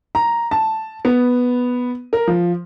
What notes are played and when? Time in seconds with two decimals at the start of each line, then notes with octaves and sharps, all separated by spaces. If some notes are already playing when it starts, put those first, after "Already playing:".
0.15 A#5
0.51 A5
1.05 B3
2.13 A#4
2.28 F3